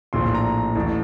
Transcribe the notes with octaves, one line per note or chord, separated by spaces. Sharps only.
A#1 A2 C6
C6
A#5
A1 A2